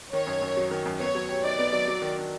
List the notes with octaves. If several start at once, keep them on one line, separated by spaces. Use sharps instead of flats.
D#3 C#5
F#2
F#2
F#3
D#3
F#2
B3 C#5
F#3
G4
D#4 D5
B3
F#3
F#3
D#3
D4